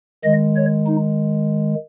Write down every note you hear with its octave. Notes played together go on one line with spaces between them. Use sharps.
D#3 G#3 D#5
C#5
D#4